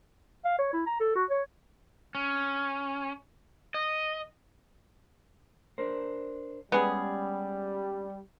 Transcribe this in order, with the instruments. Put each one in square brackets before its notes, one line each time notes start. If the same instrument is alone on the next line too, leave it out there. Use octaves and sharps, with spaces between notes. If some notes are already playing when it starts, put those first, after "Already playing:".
[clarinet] F5
C#5
E4
A#5
A4
F#4
C#5
[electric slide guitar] C#4
D#5
D4 A#4 C5
[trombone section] G3 [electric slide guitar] G#3 C#4 [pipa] B3 G#4